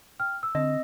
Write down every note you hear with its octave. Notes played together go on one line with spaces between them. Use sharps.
G5 F6
E6
D3 C4 D#5